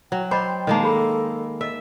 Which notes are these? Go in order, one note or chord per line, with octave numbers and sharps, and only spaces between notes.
F#3 G5
C5 D#5 B5 D6
D#3 G#3 A#3 D#4 C5
G#4 A4 B5
A4 D#5 E5